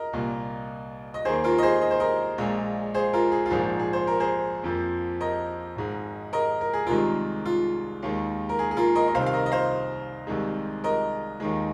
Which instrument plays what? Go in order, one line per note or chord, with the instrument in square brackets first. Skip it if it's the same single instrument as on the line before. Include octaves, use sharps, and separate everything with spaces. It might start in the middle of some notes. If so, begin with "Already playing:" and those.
Already playing: [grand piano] A#4 D#5
C2 A#2 A#3
D#5
D#2 D#3 A#3 G#4 C5
F4 A#4
D#5
G#4 C5
D#5
C5
A#4 D#5
A#1 A#2 G#3
G#4 C5
F4 A#4
G#4
F4
A#1 G#2 F3 A#3 G#4
G#4
C5
A#4
G#4 C5
F2 F3 A#3
A#4 D#5
G#1 G#2 G#3
A#4 D#5
A#4
G#4
C2 C3 D#3 G#3 F4 A#4
F4
D#2 D#3 G#3
A#4
G#4
G#4
F4 A#4
A#4 D#5
D#5
C2 C3 D#3 C5 F5
F5
A#4 D#5
D#5
C5 F5
C2 C3 D#3 G#3
A#4 D#5
D#2 D#3 G#3